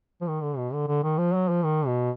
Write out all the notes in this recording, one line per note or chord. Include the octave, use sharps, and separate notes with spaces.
F3
D#3
D3
B2
D3
D3
D#3
F3
F#3
F3
D#3
B2